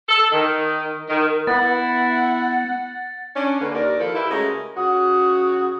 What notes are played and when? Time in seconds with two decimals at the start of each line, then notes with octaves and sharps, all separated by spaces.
0.09 A4
0.32 D#3
1.09 D#3
1.47 B3 E4 F#5 A6
3.35 C#4 D4
3.60 D3 A#3 B4
3.73 D#2 A#4 D5
3.99 F3 E4 F4 A4
4.15 E4 G4 B4 E5
4.30 C#3 G#3 A3 C#4 F#4 A#4
4.77 C#3 F#4 D#6